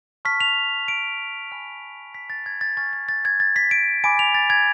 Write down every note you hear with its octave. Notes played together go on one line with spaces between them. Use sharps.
A5 C#6 F6 B6
F7
D7
G#5 B5 F6
B6
A6
G#6
A6
G#5 C#6 F6 A6
A6
A6
G#6
A6
B6
D7
G#5 B5 D6 D7
F7
A6
G#6